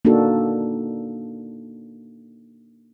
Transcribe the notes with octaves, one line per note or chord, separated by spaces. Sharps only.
A#3 D4 D#4 F#4 A4